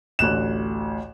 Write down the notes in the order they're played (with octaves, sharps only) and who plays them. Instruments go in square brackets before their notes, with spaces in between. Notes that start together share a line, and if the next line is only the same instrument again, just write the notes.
[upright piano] A1 D2 F#6 E7